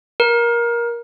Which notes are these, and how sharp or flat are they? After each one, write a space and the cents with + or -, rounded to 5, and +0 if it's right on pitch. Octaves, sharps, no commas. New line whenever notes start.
A#4 +20